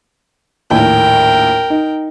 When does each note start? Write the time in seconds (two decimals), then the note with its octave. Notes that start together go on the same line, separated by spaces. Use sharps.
0.70 A#1 D#2 A2 A#4 G5
1.70 D#4